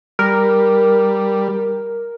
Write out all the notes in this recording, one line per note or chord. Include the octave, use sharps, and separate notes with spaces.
G3 A#4